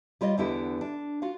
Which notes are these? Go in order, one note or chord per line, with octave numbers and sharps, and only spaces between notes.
G3 F4 C#5 D#5
E2 D3 B3 E4 G4
D4
F4 F#4 F5